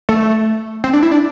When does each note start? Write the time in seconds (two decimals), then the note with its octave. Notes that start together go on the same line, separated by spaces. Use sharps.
0.09 A3
0.84 C4
0.93 D4
1.03 E4
1.12 D4